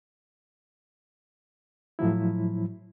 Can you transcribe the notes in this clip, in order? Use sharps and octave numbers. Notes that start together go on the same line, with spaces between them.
A2 F3 F#3 E4